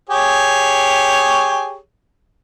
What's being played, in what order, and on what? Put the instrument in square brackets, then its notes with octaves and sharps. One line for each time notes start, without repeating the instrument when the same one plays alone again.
[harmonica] G4 G#4 C#5